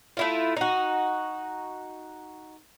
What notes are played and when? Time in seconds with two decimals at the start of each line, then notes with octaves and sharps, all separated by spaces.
0.17 A3 E4 F4
0.57 D#4 F#4